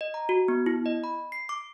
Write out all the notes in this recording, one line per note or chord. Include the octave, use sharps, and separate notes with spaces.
D#5
A#5
F#4
B3
E4
D#5
B5
C7
D6